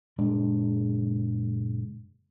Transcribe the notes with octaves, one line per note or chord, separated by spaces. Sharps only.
F#1 A#2 G#3 D4